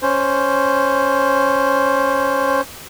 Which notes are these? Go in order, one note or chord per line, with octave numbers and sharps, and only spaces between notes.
C#4 C5